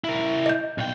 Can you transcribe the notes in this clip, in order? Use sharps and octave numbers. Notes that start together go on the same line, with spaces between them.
E4 A#4
D#5 G6
B1 G5